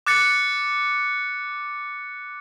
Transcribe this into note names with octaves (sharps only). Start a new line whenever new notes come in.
D6 F#6 A6 C#7